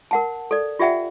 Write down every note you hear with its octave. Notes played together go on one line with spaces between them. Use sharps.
A#4 F#5 A5
A4 D5
F4 G4 D5 E5 F#5 G5